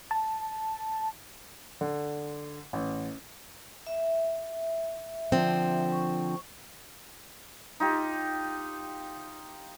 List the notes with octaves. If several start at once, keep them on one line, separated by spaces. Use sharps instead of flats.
A5
D3
A1
E5
D3 F3 C4
C#6
D#4 F4 G4